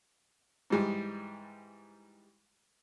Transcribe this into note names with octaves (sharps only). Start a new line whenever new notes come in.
G#2 E3 G3 G#3